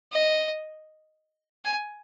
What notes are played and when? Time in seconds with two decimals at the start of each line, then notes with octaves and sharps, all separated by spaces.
0.12 D#5
1.65 G#5